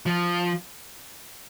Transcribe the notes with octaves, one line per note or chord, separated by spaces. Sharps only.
F3